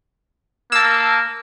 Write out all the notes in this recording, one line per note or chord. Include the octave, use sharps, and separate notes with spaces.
A#3 A5 E6